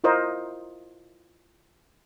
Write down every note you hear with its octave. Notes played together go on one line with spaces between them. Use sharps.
E4 F4 A#4 C5 D#5